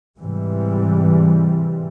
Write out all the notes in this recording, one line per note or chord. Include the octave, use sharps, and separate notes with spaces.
G#2 C3 E3 G3